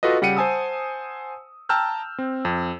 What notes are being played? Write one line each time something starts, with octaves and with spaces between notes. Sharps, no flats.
F4 F#4 A4 B4 D#5
C#3 G3 F#5 G5 C#7 D#7
C5 F#5 G#5 A5 D#6 E6
G5 A5 A#5 E6 F6 G6
C4
F2